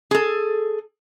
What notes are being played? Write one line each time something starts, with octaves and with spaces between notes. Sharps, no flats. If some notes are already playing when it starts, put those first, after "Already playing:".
G#4 A4